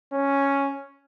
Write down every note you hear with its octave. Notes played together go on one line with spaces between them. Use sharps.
C#4